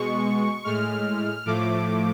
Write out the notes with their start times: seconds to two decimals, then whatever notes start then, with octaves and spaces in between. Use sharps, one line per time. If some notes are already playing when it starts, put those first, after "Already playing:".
Already playing: B2 G#3 C#6
0.64 A2 G#3 F6
1.45 A2 F3 A3 D6